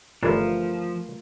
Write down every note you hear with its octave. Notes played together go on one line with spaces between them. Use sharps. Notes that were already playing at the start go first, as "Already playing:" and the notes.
G1 E3 F3 A3 D4 F4 A#4